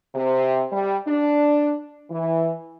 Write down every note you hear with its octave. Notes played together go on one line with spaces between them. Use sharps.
C3
G3
D4
E3